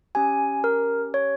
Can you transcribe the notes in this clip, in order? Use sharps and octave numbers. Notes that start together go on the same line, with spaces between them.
C#4 G4 G#5
A#4
C#5